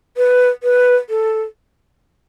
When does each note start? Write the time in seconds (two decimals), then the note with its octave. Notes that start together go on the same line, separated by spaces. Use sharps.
0.17 B4
0.63 B4
1.09 A4